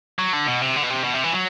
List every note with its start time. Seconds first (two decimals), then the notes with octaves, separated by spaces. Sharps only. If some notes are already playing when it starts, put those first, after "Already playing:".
0.19 F#3
0.33 D3
0.47 B2
0.62 C3
0.76 D3
0.83 B2
0.90 C3
1.04 B2
1.14 C3
1.24 E3
1.32 F#3